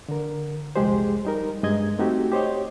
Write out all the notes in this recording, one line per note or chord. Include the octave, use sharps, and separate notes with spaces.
D3 A#4
C2 F2 G#3 G4 G#4 C5
G3 D#4 A#4
G2 G#3 D#5 G#6
A3 C4 D#4 F#4 G4
G4 C5 C#5 D#5